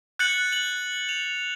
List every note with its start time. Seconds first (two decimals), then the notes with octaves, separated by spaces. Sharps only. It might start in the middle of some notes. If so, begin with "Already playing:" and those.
0.19 F#6 G6 A6 C#7 F#7
0.52 F#6 F#7
1.09 F7